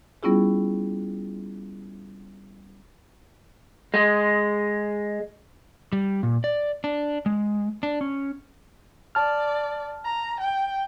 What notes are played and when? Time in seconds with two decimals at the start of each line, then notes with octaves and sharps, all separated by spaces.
0.23 G3 B3 C#4 E4 F4 G#4
3.94 G#3
5.93 G3
6.23 A#2
6.44 D5
6.84 D4
7.26 G#3
7.83 D4
8.01 C#4
9.15 D5 A5 F6
10.04 A#5
10.41 G5